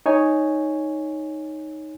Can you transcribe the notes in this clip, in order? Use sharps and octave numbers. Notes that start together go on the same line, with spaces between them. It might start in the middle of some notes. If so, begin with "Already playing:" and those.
D#4 C#5 G#5